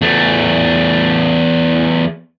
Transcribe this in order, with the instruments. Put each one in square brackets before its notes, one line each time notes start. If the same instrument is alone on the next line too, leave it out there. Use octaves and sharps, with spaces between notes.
[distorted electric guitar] E2 A3